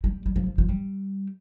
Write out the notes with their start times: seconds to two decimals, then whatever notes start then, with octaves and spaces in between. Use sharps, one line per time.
0.04 G3
0.26 G3
0.36 F3
0.46 F3
0.58 F3
0.68 G3